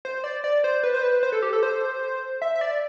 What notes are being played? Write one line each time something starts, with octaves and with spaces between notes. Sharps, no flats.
C5
D5
D5
C5
B4
C5
B4
C5
A4
G4
A4
C5
E5
E5
D5